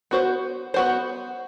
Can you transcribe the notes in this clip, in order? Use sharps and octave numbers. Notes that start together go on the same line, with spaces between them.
B3 F#4 C5
B3 F#4 C5